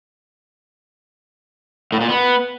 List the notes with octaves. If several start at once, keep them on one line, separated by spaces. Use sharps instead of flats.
A2
A#2
B3